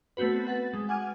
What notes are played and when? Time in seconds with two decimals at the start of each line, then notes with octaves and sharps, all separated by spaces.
0.17 A3 B3 C4 F#4 B4
0.47 B4 F#5 A6
0.73 G#3
0.89 F#5 G#5 D6 F6 G#6 D#7